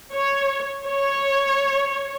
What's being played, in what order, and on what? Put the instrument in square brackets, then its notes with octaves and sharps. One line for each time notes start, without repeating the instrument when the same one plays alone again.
[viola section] C#5
C#5